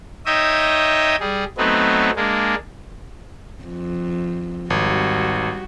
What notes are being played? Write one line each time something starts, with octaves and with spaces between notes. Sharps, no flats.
D#4 C#5 D#5 E5 G5 D#6
G3 G#4
F#3 A3 B3 C4 D#4
G#3 A#3 D4
F2
G#1 G3 F#4